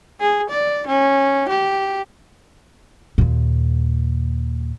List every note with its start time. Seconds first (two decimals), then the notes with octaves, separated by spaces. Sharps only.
0.20 G#4
0.50 D5
0.87 C#4
1.49 G4
3.18 D#2 A#2